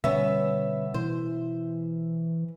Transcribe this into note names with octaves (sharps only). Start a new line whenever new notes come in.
B2 D3 G3 B3 C#4 E5
B2 E3 C5